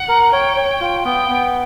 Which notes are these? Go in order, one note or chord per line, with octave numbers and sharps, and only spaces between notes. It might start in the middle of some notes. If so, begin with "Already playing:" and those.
Already playing: F#5
A#4
C#5 G5
C#5
F4
B3 G5
B3